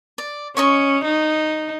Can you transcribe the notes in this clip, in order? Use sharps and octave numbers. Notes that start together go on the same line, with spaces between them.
D5
C#4 C#5 D#5 C#6
D#4